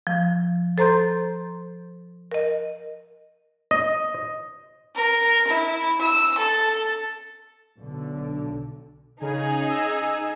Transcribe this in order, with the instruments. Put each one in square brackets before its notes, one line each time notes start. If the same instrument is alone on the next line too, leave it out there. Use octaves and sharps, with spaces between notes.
[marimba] F3
A4 C5 A#5 C6 G6
A#4 D#5
[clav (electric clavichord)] D#5
[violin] A#4
E4
E6
A4
[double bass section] B1 D3
[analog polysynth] C#3 [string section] D#4 G#4
[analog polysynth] D#5 E6